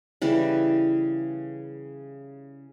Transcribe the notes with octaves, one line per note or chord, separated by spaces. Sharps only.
C#3 E3 G3